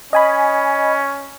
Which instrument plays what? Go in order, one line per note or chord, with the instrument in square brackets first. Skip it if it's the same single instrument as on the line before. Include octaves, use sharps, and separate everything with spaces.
[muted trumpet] C#4 [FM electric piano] D#5 G#5 B5